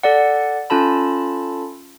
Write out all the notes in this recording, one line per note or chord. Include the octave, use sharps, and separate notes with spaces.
A4 D5 F#5
C#4 F4 A4 A5 B5